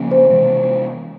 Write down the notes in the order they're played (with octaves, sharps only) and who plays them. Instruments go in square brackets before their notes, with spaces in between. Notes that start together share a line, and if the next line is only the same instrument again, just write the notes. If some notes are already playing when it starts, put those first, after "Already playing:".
Already playing: [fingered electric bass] C#3 F3 A#3 C#4
[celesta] C5
[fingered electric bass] C3 E3 G#3 B3